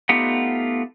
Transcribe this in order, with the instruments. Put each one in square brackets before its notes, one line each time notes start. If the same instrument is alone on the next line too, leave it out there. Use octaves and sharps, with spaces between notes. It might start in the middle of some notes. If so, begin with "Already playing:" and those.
[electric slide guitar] A3 B3 D#4 F4 G4 F#5